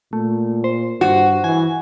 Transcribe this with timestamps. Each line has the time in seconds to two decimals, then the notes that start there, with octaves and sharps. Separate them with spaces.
0.13 A#2 A3
0.64 C5
1.01 G2 F#4
1.44 E3 G#5